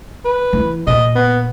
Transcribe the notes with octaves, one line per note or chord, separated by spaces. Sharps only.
B4
E3
A#2 D#5
B3